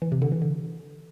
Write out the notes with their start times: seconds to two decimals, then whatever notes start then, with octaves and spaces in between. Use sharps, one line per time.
0.02 E3
0.12 C3
0.22 D3
0.32 E3
0.42 D3